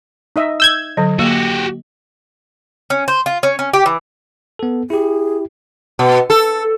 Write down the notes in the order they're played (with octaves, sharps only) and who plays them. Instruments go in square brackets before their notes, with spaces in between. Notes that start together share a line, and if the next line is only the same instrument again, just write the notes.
[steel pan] D#4 D#5 E5
[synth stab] E6 G6 G#6
[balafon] D3 F#3 [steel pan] D#5
[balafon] A#3 [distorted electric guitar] F#4 G4
[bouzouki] C#4
C5
F4
C#4
C#4
G4
E3
[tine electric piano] B3 A4
[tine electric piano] E4 G4 [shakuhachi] G#4
[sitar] B2
A4